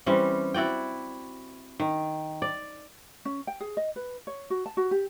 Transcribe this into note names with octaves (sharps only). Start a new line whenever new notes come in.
E3 G3 C4 C#4
E4 F#4 D5 G5
D#3
D5
C#4
G5
G#4
D#5
B4
C#5
F#4
A5
F#4
G4